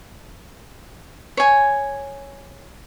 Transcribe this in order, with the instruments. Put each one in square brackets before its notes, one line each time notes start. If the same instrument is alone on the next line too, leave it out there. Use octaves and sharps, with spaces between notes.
[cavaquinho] C#5 G#5